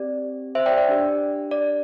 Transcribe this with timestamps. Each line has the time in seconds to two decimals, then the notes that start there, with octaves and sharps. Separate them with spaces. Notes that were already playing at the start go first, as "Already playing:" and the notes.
Already playing: C4 G4 D5
0.55 C5 E5
0.66 D5 G5
0.78 D5
0.88 D4 G4
1.51 D5